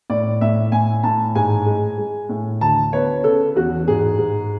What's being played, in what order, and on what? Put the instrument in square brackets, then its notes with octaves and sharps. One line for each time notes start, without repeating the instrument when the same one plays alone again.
[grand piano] A2 D5
A2 E5
A2 G#5
A2 A5
G#2 G#5
G#3
G#3
A2
D2 A5
B3 C#5
C#3 A4
E2 F#4
G#2 G#4
G#2